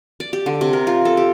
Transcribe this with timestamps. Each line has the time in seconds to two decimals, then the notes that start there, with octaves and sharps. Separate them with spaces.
0.20 D5
0.33 G4
0.46 D3
0.61 C3
0.73 A#4
0.87 F4
1.05 A4
1.17 G4